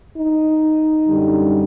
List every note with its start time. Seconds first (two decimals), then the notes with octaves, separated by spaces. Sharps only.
0.17 D#4
1.07 F#2 D3 G3